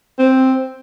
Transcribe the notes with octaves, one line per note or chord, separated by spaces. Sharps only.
C4